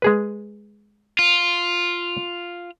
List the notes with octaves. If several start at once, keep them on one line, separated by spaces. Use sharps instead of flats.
G#3 G#4 B4
F4